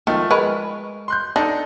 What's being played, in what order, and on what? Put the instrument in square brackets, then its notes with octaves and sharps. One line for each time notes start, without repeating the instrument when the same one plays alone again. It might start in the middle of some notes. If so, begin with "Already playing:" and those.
[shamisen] D#3 [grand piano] F3 A3
[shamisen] G#3 A#4 B4 [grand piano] C#6
[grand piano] C6 F#6 G6
[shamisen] D4 [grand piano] D#4 A4